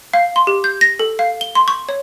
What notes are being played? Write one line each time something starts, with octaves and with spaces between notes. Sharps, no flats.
F5
C6
G4
G6
A#6
A4
F5
G7
C6
C#6
C#5